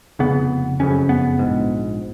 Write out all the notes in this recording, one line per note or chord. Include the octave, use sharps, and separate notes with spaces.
F1 F2 C#3 B3
F#1 F2 C#3 C#4
B3
A#1 G#2